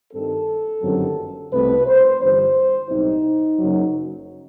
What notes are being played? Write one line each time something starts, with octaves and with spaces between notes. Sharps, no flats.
G2 D#3 G3 C4 A4
G1 F#2 D#3 F#3 C4
C2 B2 A3 C4 B4
C5
G1 G2 E3 G3 C5
B1 A2 G3 C4 D#4
F#1 F#2 F#3